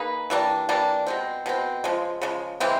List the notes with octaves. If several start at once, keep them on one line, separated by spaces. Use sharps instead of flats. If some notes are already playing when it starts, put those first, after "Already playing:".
Already playing: A#3 D#4 G#4 B4
E3 G3 A#3 D4
E3 G3 A#3 D4
B2 G#3 C4
B2 G#3 C4
C#3 F3 G#3
C#3 F3 G#3
C#3 E3 G#3 C4